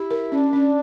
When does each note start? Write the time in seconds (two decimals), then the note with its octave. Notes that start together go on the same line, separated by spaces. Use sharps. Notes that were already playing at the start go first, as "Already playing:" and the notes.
Already playing: E4 G4
0.11 A#4
0.31 C#4 D4
0.53 C#4